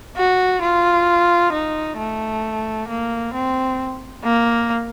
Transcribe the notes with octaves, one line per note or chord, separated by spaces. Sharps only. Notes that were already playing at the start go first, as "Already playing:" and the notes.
F#4
F4
D#4
A3
A#3
C4
A#3